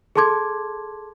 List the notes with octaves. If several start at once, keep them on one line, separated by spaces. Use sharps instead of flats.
G#4 A4 A5 C6 D6 G#6